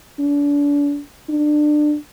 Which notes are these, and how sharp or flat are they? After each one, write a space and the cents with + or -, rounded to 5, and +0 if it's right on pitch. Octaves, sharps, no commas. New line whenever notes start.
D4 -35
D4 +25